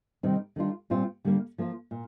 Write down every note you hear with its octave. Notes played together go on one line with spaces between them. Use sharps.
C3 D#3 G3 C4 D#4
D#3 G3 D4 F4
A#2 G3 C4 F4
D3 G3 A#3
F3 A#3 F4
A#2